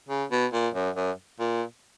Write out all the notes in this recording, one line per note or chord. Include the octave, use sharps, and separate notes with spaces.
C#3
B2
A#2
F#2
F#2
A#2